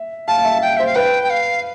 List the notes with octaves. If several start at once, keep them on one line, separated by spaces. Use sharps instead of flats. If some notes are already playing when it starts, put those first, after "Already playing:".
Already playing: E5
F5 A5
F5
E5
G5
C5 E5
F5
B4 G5
G5
F5